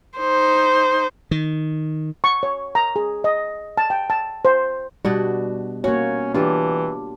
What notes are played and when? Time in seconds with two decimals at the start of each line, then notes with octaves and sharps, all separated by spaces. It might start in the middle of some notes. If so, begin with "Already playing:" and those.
0.19 D#4 C5
1.31 D#3
2.24 C#6
2.43 C#5
2.75 A#5
2.96 G#4
3.24 D#5
3.77 A5
3.90 G5
4.10 A5
4.45 C5
5.05 B2 G3 D4 F#4
5.84 A#3 C#4 F#4 C#5
6.34 E3 D4 F4 G4